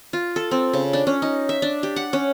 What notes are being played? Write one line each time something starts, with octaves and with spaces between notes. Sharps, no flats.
F4
A4
C4
C#3
D4
C#4
D#4
E5
D4
G4
F#5
C#4